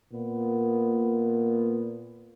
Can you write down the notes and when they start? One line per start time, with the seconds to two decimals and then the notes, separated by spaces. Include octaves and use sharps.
0.12 A#2 B3